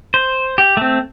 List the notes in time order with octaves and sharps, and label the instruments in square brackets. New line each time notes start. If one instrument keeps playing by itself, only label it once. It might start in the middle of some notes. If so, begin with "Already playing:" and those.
[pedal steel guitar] C5
G4
A3 C4